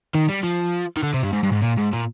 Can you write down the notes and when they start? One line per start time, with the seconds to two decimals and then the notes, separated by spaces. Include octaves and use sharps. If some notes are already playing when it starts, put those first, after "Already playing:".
0.15 D#3
0.29 G3
0.43 F3
0.97 D#3
1.03 D3
1.14 C3
1.23 G2
1.33 G#2
1.43 G2
1.52 G#2
1.62 A#2
1.78 G#2
1.93 A#2